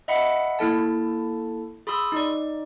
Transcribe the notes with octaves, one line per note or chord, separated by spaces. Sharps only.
D#5 E5 F#5 B5 C#7
A#3 E4 A4 A5
G#4 B5 C6 D#6 E6
D#4 D5